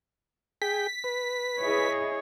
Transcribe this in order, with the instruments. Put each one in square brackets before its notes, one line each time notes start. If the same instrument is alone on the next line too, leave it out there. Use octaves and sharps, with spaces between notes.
[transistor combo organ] G#4 G5 [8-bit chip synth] B6
[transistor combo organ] B4
[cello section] E4 G#4 D#5 [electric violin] C#5